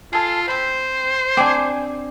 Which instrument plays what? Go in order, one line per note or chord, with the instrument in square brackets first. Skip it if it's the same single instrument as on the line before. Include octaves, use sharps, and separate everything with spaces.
[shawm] F4 [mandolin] G#4 A4
[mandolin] C4 B5 [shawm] C5
[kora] C4 D4 [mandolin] G#4 G#5 D6